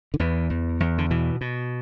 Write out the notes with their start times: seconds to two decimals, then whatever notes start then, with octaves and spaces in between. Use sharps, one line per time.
0.14 D3
0.19 E2 E3
0.50 E2
0.80 E2
0.98 D3
1.10 B2 E3
1.41 B2